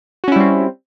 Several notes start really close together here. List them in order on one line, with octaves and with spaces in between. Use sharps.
F#4 C#4 E4 G3 C4